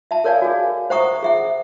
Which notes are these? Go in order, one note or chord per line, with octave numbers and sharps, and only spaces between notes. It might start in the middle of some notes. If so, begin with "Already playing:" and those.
E5 A5
A4 A#4 C#5 D5 F5 G#5
F#4 G#4
C5 E5 F#5 A#5 C#6 D#6
G#4 E5 F#5